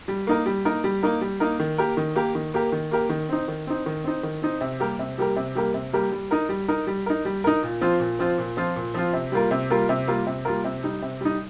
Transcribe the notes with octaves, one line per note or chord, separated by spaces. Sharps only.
G3
A#3 D#4 A#4
G3
A#3 D#4 A#4
G3
A#3 D#4 A#4
G3
A#3 D#4 A#4
D#3
A#3 G4 A#4
D#3
A#3 G4 A#4
D#3
A#3 G4 A#4
D#3
A#3 G4 A#4
D#3
C4 D#4
D#3
C4 D#4
D#3
C4 D#4
D#3
C4 D#4
C3
G3 A#3 G4 A#4
C3
G3 A#3 G4 A#4
C3
G3 A#3 G4 A#4
C3
G3 A#3 G4 A#4
G3
D#4 A#4
G3
D#4 A#4
G3
D#4 A#4
G3
D#4 A#4
A#2
F3 C4 F4
A#2
F3 C4 F4
A#2
F3 C4 F4
A#2
F3 C4 F4
C3
G3 A#3 F4 A#4
C3
G3 A#3 F4 A#4
C3
G3 A#3 F4 A#4
C3
G3 A#3 F4 A#4
C3
G3 D#4
C3
G3 D#4